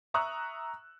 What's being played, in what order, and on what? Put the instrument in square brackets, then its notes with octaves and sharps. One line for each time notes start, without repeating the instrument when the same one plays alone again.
[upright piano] E5 A#5 C#6 D#6 E6 F#6